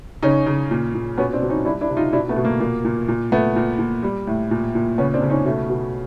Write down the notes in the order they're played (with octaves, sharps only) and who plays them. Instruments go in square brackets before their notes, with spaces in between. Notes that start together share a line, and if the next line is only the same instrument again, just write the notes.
[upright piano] C#3 C#4 D#4
C#3
A#2
A#2
B2 B3 C#4
C4 D4
B2
C#4 D#4
G3 D4 E4
D4 E4
C3
D#4 F4
B2 D4 E4
A3 B3
B2
A#3
A#2 A#3
A#2
A#2
A#2 A3 B3
A#2
A#2
G3
A2
A#2
A#2
C#3 B3 C#4
C4 D4
C#3
C#4 D#4
B2 A3
B2